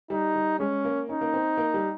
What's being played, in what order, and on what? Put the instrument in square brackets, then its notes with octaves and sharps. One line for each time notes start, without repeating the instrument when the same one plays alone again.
[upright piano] G3 [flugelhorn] D#4
[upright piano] G3
[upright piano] G#3 [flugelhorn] C#4
[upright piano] A#3
[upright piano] C#4 [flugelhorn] D#4
[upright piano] A#3
C4
A#3
G3